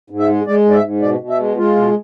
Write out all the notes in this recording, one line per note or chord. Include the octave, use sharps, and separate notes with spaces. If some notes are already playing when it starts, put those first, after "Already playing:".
G#2
E5
G#3
G#3 D5
G#2
D5
E5
G#2
B2 D5
B2
E5
G#3
G#3 F4
B2